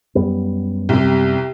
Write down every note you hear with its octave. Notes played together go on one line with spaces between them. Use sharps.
F#2 G3 B3
C2 C3